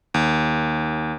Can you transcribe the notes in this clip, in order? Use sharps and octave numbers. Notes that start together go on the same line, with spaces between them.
D#2